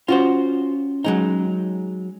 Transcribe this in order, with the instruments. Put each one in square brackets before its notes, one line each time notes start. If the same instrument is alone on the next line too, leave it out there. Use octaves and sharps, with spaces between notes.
[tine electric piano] C#4 [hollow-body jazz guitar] F4 F#4 C5
[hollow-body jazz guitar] F#3 G#3 D#4